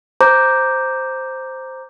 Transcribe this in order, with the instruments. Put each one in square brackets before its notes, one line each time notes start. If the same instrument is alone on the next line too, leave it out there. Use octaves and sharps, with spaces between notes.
[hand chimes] C5 A#5 D6 G6